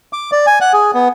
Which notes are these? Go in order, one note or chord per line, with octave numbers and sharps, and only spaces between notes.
D6
D5
G#5
F#5
G#4
B3